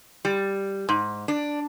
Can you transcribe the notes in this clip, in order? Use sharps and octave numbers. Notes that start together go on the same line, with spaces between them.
G3
G#2
D4